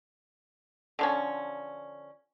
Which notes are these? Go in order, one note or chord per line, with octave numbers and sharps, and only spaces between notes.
D3 F3 C#4